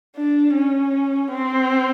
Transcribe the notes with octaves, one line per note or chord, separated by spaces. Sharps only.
D4
C#4
C4